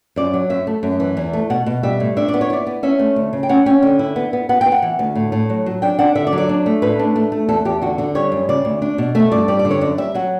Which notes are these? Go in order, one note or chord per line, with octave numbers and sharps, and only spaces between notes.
F#2 D5
F#3
F#2 E5
A3
F#2
E3
E2
A3
B2 F#5
B2
G3 E5
A2
D4 E5
D5
B3
C#5
E4 D5
B3
C#4 E5
A3
D2
C#3
G5
C#4 F#5
C#4 G5
D3
E4
B3
B3
B3 F#5
G5
B3
F#5
E3
D2
A2
A2
F#3
F#3
D4 G5
D4 F#5
D3 E5
D5
F#3
D5
D4
A3
A2 B4
D4
A3
A3
E2 A4
E2 G4
D3 F#4
D3 F#4
G3 C#5
F#2
C#3 D5
D2
D4
B2
A3 E5
G2 D5
G3 D5
D5
D3
C#5
F#2 D5
G3 E5
F#3 F#5